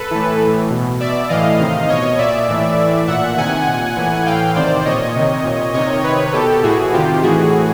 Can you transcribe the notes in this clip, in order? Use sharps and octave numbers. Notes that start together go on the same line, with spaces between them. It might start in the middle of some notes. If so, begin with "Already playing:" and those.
Already playing: A4 B4
A2 E3
A2 E3
B2
B2 D5 E5
A2 E3 D#5 F5
C3 D#3
B2 C#5 D#5
A#2 D5 E5
A2 E3
A2 E3
A#2 E5 F#5
C3 D#3 F#5 G#5
A#2
A2 E3
A2 E3 F5 G5
C3 D#3 C5 D5
A#2 C#5 D#5
C3 D#3
A#2
C3 D#3 C#5 D#5
C3 D#3 B4 C#5
B2 G4 A4
A2 E3 F#4 G#4
C3 D#3 F4 G4
A2 E3 F#4 G#4